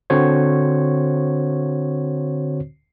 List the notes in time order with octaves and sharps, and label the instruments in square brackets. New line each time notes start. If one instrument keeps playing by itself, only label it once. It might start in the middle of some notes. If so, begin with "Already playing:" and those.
[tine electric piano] D3 C4 F#4 C5 C#5